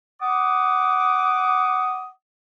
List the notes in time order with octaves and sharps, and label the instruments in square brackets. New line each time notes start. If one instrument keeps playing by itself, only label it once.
[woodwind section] F#5 D6 D#6